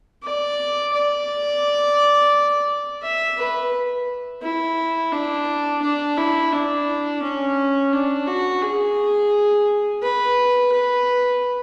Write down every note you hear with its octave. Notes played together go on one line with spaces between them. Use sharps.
D5
D5
E5
B4
E4
D4
D4
E4
D4
C#4
D4
F#4
G#4
B4
B4